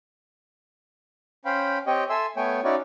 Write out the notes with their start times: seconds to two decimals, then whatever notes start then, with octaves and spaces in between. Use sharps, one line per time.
1.45 C#4 C5 F5 G5 B5
1.87 C4 G4 C#5 D#5 G5
2.10 A4 E5 G#5 C6 E6
2.36 A3 B3 C#5 G5 G#5
2.64 C#4 D#4 E4 F#4 C#5 D5